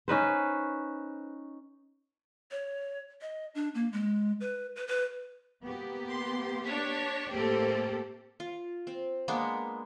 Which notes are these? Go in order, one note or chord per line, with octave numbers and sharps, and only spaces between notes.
C#4 D#4 B4 C5
C#5
D#5
D4
A#3
G#3
B4
B4
B4
A#3 B3 G4
C6
D4 C#5 B6
A2 A#3 C4 G4 A4
F4
C4
G#3 A#3 B3 D4